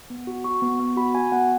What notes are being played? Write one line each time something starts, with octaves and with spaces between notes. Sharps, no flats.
B3
F#4
F#4 C#6
B3
B3
F#4 B5
F#4 G#5
B3 F#5